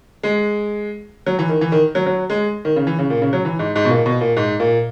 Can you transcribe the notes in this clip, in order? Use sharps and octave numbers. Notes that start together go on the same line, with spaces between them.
G#3
F#3
E3
D#3
E3
D#3
F#3
F#3
G#3
D#3
C#3
E3
C#3
A#2
C#3
F#3
E3
G#2
G#2
B2
A#2
B2
A#2
G#2
A#2